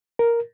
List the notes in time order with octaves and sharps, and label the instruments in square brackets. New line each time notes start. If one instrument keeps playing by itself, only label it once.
[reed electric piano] A#4